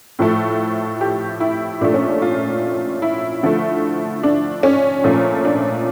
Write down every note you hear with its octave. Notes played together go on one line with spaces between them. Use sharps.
A2 F3 A3
G4
E4
A#2 F3 A3 D4
C#4
D4
F4
E4
D3 F3 A3
D4
C#4
A#2 F3 A3
D4